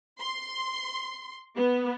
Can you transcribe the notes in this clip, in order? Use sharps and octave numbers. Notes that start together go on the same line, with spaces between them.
C6
B3